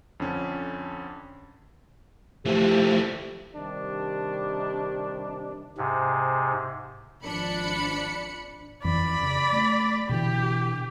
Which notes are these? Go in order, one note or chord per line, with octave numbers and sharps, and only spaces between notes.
F2 D3 C#4
E3 F3 G3 A3 G4
C3 D#3 G3 D4
G#2 C3
G#1 F3 D4 B5 C#7
F2 E3 D5 B5
C#3
A3
B2 D3 E3 G4